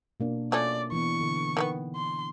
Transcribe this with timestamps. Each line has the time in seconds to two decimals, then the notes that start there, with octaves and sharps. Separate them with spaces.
0.20 B2 A#3 D4
0.52 F3 A3 C#4 D5
0.92 E3 B3 C#6
1.21 D3
1.57 D#3 A3 B3
1.95 C6